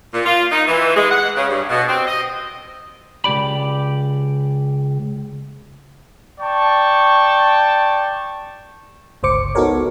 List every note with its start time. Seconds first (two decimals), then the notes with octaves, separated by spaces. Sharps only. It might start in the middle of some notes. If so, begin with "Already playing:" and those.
0.14 A#2
0.25 F4
0.51 D#4
0.67 E3
0.96 G#3
1.11 F#5
1.36 C#3
1.48 G2
1.69 B2
1.88 C4
2.07 D#5
3.24 C#2 G2 G4 D5 B5
6.40 D5 G5 A5 C#6
9.23 G1 C#2 C5 D6 C#7
9.55 B3 D#4 F#4 A4 A#4 C#5